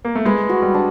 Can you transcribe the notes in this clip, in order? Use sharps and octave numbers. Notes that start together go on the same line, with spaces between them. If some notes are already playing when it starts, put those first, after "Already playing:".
A#3
A3
G#3 B4
F#4
G3
D4